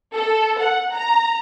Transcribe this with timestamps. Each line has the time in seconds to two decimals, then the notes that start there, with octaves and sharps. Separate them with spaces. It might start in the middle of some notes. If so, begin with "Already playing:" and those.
0.14 A4
0.60 F#5
0.93 A#5